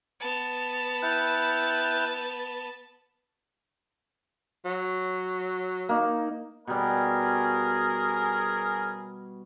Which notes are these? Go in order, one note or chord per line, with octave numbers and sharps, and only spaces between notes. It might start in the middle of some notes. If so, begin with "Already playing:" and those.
B3 A5
E4 G5 F#6
F#3
A#3 D#4
B2 G3 C#4 G#4 A#4